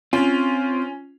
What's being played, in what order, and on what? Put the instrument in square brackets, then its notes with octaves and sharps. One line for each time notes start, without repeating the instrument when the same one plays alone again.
[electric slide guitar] C4 [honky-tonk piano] C#4 [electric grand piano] F4